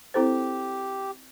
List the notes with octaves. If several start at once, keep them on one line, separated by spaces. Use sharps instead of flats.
C4 E4 G4 A4 C5